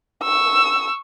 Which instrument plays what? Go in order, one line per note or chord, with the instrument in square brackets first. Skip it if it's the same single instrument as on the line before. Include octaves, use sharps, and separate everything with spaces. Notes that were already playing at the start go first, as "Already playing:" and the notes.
[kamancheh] C#6 E6